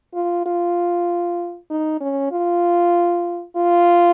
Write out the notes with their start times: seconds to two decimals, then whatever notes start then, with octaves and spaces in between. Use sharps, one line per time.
0.14 F4
0.46 F4
1.70 D#4
2.00 C#4
2.32 F4
3.56 F4